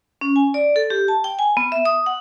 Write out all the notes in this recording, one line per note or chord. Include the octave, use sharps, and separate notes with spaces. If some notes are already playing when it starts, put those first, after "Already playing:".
C#4
G#5
D5
A4
G4
A5
G5
G#5
B3
E5
D#6
F#5